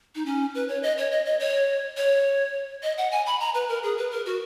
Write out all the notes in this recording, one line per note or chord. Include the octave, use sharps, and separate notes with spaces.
D#4
C#4
B4
C#5
D#5
C#5
D#5
D#5
C#5
C#5
D#5
F#5
G#5
B5
A#5
B4
A#4
G#4
B4
A#4
F#4